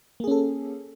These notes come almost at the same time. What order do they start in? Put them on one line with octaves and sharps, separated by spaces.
A#3 G#4 C#4 A4